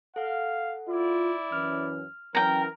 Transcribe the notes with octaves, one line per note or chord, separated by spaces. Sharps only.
A4 F5 F#5
E4 F4 D5
F#2 E3 C#4 F6
E3 F#3 C#4 A#4 G5 A#5